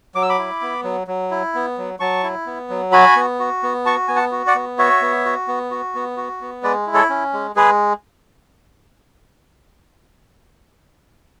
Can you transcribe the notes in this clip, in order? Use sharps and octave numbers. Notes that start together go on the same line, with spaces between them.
F#3 D6
E6
B5 D6
E4
B3
F#3
F#3
E4
B3
F#3
F#3 A5 C#6
E4
B3
F#3
F#4 G#5 B5
B3
F#4
B3
F#4 A5 C#6
B3 G#5
F#5 A5
F#4
D5 F#5
B3
F#4 C#5 E5
B3
F#4
B3
F#4
B3
F#4
B3
G#3 B4 D5
E4
A4 C#5
C#4
G#3
G#3 G#4 B4